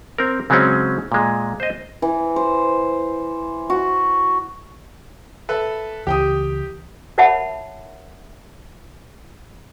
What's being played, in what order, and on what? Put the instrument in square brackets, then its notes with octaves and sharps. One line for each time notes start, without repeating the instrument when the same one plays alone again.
[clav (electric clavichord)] C4 A#4
C#3 F#3 G#3 C4 C#4
A#2 G#3
C5 D#5
[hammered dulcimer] E3
C5
F#4
[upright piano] A4 B4 E5
[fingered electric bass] C#2 E3 [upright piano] G4 G5 D#6
[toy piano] A#4 C#5 E5 F#5 A5 B5